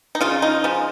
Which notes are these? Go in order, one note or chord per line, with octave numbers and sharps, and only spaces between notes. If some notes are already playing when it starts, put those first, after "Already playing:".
D#4
C#3 F4
D#4
F3 G#3